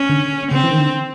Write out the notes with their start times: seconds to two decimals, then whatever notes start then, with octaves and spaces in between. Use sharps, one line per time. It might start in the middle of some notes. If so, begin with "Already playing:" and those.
Already playing: C#4
0.09 D3
0.51 C#3 C4
0.64 E3
0.71 D#3
0.80 D3